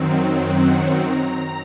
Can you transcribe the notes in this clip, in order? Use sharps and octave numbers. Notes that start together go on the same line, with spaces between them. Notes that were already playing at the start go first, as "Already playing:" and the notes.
Already playing: F#2 D#3 F#3 C4
F#5
A#5